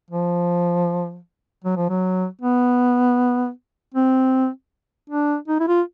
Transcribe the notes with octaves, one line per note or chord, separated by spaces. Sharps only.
F3
F#3
F3
F#3
B3
C4
D4
D#4
E4
F4